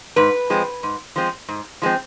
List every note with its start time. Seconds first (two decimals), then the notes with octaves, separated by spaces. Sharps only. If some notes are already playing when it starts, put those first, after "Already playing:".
0.16 G#2 B4
0.50 F3 G#3 C4
0.83 G#2
1.16 F3 G#3 C4
1.49 G#2
1.82 F3 G#3 C4